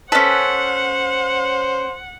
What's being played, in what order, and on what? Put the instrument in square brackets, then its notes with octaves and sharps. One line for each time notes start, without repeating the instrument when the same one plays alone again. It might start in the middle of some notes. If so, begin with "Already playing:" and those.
[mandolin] C#4 B4 [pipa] A4 [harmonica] C5 [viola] F#5